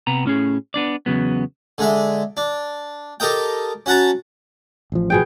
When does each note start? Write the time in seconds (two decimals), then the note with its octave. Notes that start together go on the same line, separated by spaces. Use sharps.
0.07 C3 B3 A#5
0.25 A2 C#4 G#4
0.74 B3 D4 D5
1.06 E2 A2 C#3 F#3 B3
1.78 D3 G#3 E5
2.37 D4
3.20 G4 A4 A#4 D#5 G5
3.86 C#4 F#4 F#5 A5 A#5
4.92 A1 F3
5.10 B2 G#4 G5